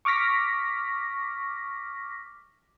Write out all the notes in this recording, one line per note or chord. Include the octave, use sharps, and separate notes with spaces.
C#6 D6 F6 A#6 B6